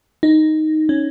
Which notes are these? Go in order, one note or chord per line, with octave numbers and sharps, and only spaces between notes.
D#4
C#4